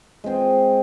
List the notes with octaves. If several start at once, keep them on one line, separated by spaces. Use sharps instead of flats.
G#3 C4 G#4